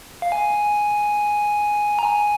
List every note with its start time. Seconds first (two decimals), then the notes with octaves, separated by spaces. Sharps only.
0.22 F5
0.32 G#5
1.99 A#5
2.03 G#5